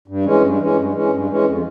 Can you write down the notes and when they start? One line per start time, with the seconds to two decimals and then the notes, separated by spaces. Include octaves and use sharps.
0.08 G2
0.25 E3 G#3 C#4
0.42 G2
0.60 E3 G#3 C#4
0.76 G2
0.94 E3 G#3 C#4
1.11 G2
1.28 E3 G#3 C#4
1.44 F2